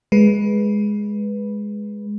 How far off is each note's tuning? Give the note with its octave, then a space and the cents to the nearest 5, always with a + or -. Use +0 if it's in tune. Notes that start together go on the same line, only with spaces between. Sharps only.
G#3 +0 B4 -10